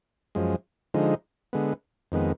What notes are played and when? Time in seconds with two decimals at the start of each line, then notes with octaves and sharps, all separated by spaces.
0.35 F#2 F3 G#3
0.94 D3 F3 G#3 D#4
1.53 D3 G#3 B3
2.12 F2 D#3 G#3 B3